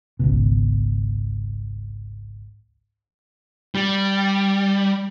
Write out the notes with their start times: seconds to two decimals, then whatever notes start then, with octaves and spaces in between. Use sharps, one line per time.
0.19 G#1 C#2 B2
3.75 G3